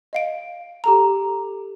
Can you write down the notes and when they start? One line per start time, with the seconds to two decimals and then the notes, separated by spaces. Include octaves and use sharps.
0.13 D#5 F5 D7
0.84 G4 A4 A#5